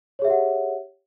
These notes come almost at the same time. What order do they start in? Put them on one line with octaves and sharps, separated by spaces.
C#5 G#4 E5 G4 F#5